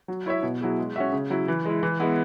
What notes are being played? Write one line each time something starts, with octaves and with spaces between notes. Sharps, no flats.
F#3
E4 C#5 E5
B2
F#3 E4 G#4
G#3
C#4 F#4 E5
C#3
F#3 E4
E3
G#3 E4
E3
G#3 B3 E4